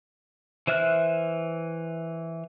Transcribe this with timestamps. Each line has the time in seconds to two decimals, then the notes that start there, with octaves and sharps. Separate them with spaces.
0.67 E3 C5 E5 F6 F#6